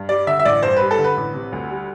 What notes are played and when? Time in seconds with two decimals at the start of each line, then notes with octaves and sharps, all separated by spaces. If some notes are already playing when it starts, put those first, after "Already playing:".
Already playing: G2
0.09 G3 D5
0.27 D3 E5
0.39 E5
0.45 A1 D5
0.63 G2 C5
0.76 G3 B4
0.91 A4
0.98 D3
1.04 B4
1.17 A1
1.34 C3
1.52 D2
1.70 G3